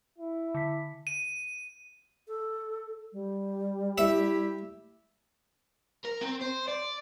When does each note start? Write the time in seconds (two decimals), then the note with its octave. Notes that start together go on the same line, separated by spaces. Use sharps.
0.19 E4
0.55 D3 B6
1.07 D#7
2.28 A4
3.13 G3
3.98 E4 G4 E5
6.05 A#4
6.21 C4
6.41 C5
6.68 D5